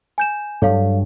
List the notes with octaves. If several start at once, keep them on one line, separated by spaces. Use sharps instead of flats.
G#5 G6 E7
G2 F#3 A4 C#5 F5